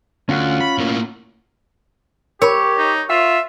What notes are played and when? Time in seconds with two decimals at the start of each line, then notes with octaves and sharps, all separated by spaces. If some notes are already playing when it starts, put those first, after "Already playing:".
0.29 D2 C#4 F4 F#5
0.60 B5
0.78 A2 A#3
2.42 G4 A#4 C#5 B5
2.78 D#4
3.10 F4 E5 F#5